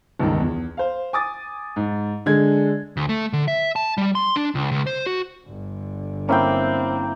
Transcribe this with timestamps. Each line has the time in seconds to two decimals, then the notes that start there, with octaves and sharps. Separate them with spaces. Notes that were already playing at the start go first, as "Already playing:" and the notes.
0.19 G1 C#2 D#3
0.40 E2
0.77 C5 F5
1.13 G#5 D6 D#6 A6
1.76 G#2
2.26 D3 G#3 D4 G#6
2.97 D2
3.09 A3
3.33 D3
3.48 E5
3.76 A5
3.98 G3
4.15 C6
4.36 D4
4.55 C#2
4.71 C#2
4.87 C5
5.06 F#4
5.46 G1 D3
6.29 A#3 C4 C#4 E4 C5 E5 G5